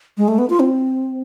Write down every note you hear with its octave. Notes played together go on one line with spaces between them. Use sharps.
G#3
A3
B3
F4
C4